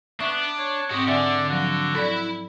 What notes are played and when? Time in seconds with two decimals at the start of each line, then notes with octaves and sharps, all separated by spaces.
0.20 B3 D4 E5 C#6
0.59 C#5
0.90 G#2 C4 F#4 G4 D#5
1.08 D3 D5 E5 F#5 G#5
1.50 F3 F#3 F#4
1.95 E4 A4 D5 B5